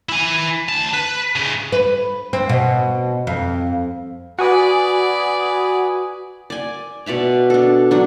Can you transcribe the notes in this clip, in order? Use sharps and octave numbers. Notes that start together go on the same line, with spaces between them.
E4 G#5
D2 A5
B4
G#2 C#3
B4
C4
B2
F2
F#4 B4 D5 G#5 D#6
D5 G#5
B2 D5 E5 A#5
D4 A4
F#3 D4